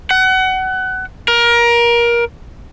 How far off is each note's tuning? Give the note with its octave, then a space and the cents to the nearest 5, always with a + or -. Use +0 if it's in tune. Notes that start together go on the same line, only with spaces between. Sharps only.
F#5 +25
A#4 +20